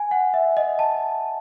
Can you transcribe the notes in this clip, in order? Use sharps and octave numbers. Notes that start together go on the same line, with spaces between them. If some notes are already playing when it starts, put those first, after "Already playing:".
Already playing: G#5
F#5
E5
D#5
A5